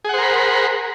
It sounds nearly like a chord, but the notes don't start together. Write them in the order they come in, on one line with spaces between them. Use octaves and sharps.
G#4 F#5 C5 A#4 B5